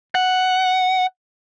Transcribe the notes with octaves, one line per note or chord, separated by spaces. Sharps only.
F#5